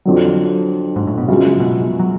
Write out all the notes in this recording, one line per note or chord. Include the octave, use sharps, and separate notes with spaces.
F2 D3 F#3
G#2
A2
B2
F#2 C#3 F3 G#3
B2
F#3